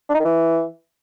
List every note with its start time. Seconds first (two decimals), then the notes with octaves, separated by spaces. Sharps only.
0.10 D4
0.15 D#4
0.20 D#3
0.25 E3